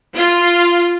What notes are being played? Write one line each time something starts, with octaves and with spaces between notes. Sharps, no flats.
F4